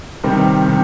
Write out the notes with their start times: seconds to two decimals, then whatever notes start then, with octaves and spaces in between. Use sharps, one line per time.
0.24 C3 D#3 G3 C4
0.66 C3 D#3